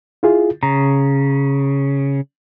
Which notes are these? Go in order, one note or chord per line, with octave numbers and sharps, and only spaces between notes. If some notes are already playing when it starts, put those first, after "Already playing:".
E4 F4 G#4
C#3 A#5